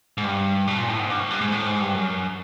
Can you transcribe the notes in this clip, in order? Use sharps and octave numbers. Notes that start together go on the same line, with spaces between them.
G#2
G2
B2
A#2
A2
G#2
G2
F#2
G2
G#2
A2
G#2
G2
F#2